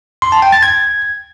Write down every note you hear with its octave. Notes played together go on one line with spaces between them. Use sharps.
C6
A5
G5
A6
G#6